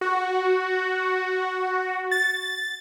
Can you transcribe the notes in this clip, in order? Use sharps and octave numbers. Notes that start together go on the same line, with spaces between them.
F#4
A6